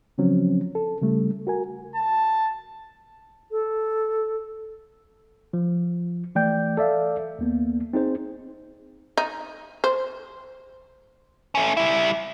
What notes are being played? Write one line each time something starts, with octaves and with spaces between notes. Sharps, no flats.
C#3 F3 F#3 C4 C#4
A4
C#3 G3 A3
F#4 A#4 G#5
A5
A4
F3
E3 A3 D5 G5 G6
A4 D5 E5 F5
D#2 A#3 B3
C4 D#4 G#4 C5
D#4
C5
A3 C#4
G3 E4